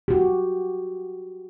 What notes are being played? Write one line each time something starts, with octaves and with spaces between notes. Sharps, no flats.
F#4 G4